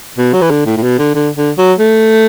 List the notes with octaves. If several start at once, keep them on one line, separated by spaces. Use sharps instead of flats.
B2
F#3
E3
D3
A2
A2
B2
D3
D3
D3
F#3
A3